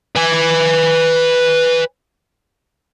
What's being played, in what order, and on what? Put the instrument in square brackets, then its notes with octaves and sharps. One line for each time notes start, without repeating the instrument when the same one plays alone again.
[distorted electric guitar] B4 G#5